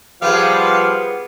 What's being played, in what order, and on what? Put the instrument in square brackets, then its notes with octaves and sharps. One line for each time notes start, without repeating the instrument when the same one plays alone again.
[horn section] F3 G3 B4 [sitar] B3 G#4 [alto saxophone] F5